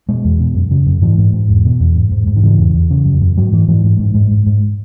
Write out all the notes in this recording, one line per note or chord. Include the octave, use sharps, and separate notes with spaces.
B2 G#3
E2
B2
F#2
C#3
F#2
G#2 E3
G#2
G#2
E2
B2
E2
G#2
G#2
G#2
D#3
C#3 E3
E2
E2
C#3
F#2
F#2
G#2 F#3
G#2 E3
G#2 E3
G#2
G#2
G#2
G#2
G#2